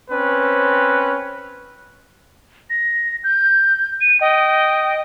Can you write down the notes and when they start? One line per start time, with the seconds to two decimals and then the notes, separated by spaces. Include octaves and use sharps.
0.11 C4 C#4 B4
2.70 A#6
3.24 G6
4.01 D#7
4.21 D#5 G5